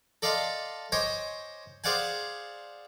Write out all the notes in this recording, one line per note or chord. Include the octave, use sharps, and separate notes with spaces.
A4 D5 D#5 F5 A5 C6
C5 C#5 D#5 G#5 D6
G#4 C5 D5 F5 F#5 G#5